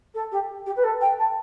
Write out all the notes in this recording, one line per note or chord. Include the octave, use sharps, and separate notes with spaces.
A4
G4
G4
B4
A4
G5
A5